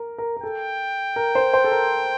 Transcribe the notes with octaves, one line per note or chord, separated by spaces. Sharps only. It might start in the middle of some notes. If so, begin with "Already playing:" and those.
Already playing: A#4
A#4
A#4
A4 G5
A#4
C5
C5
A4
A#4